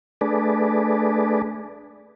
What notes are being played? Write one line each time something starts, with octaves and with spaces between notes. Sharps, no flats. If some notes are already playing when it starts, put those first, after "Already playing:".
A3 D4 G#4 B4 D5